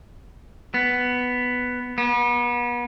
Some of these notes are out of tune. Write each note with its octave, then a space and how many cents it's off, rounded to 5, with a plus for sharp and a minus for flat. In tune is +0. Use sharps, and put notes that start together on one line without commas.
B3 +5
B3 -35